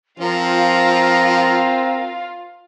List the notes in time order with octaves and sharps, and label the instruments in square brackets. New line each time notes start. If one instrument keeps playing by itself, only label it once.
[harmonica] F3 [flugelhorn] C4 [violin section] F4 F5 [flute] A#4